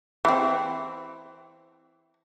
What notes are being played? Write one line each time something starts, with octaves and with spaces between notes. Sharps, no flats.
E3 C4